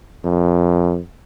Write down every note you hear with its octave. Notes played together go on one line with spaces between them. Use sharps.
F2